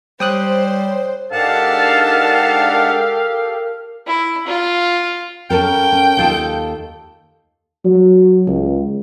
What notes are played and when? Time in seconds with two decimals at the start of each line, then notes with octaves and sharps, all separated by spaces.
0.20 G3 C5 C#5 G5 D#6 F#6
1.32 G#2 D4 G4 A4 A#4 F5 F#5 A5
4.07 E4
4.47 F4
5.50 C#4 A4 A#4 G5
5.92 C#4
6.17 D#2 F4 A4
7.85 F#3
8.47 C#2